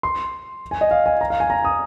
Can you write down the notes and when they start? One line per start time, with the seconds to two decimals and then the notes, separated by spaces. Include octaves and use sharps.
0.03 C6
0.71 G#5
0.81 D#5
0.91 F5
1.06 G#5
1.21 A#5
1.30 F5
1.40 G#5
1.50 A#5
1.65 D#6